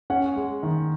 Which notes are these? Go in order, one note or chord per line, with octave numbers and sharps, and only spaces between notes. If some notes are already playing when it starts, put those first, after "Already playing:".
C#4 F#5
G#3
D#3